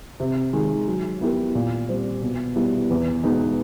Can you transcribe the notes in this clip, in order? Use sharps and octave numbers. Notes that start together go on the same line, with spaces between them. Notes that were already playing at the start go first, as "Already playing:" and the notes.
C3
D#3 G#3
F#3
B3 E4 G4 A#4
A#2
G3 C4
B2
G3 B3 E4
E2
B2 G#3 B3 D#4